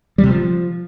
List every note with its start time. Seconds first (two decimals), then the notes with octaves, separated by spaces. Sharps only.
0.18 G3
0.24 C3
0.29 F3